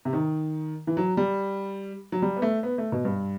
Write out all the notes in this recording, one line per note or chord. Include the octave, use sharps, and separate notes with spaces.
C3
D#3
E3
F#3
G3
F#3
G3
B3
A3
B3
A3
B2
G2